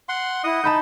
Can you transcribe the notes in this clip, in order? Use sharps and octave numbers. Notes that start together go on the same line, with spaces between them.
F#5 C6
E4 D#5 F#5 D#6
D#4 A5 B5 G6